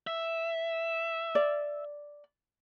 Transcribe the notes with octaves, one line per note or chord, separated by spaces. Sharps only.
E5
D5